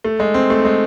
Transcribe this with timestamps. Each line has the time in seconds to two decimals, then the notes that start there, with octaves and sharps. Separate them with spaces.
0.04 A3
0.20 G#3
0.34 C4
0.50 A3
0.65 G#3